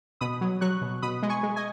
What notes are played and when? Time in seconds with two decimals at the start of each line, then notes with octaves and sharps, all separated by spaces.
0.21 B2 B5 D#6
0.41 F#3
0.61 F#3 C#6 F#6
0.82 B2
1.02 B2 B5 D#6
1.23 G#3
1.29 G#5 C#6
1.43 G#3
1.56 D#5 G#5